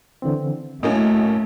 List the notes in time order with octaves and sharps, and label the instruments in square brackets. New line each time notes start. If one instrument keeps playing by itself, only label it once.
[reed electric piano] D3 E3 C4
[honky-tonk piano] A2 A#3 C#4 [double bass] A3 [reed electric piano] F#4 D#5